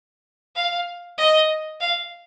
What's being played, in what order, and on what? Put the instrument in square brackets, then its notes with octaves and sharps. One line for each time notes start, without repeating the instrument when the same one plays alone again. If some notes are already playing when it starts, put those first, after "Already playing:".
[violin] F5
D#5
F5